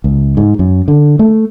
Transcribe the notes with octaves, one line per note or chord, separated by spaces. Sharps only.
C#2
G#2
F#2
D3
A3